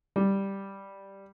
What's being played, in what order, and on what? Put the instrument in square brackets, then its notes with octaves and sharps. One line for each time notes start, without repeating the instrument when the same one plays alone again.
[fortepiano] G3